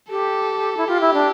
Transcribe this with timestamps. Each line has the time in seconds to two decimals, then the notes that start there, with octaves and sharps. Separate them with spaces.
0.10 G4 A4
0.77 E4
0.87 F4 G4
1.01 E4
1.13 D4